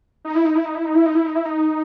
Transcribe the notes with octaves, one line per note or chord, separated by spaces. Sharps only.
D#4
E4
D#4
E4
D#4
E4
D#4
E4
D#4
E4
D#4
E4
D#4